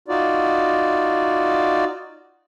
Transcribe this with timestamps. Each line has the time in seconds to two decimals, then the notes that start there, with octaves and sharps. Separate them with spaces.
0.08 D#4 F4 F#4 D5